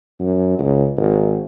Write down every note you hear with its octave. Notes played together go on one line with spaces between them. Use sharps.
F#2
C#2
G#1